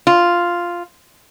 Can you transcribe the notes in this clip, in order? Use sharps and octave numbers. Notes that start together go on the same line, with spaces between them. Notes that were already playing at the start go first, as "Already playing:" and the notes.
F4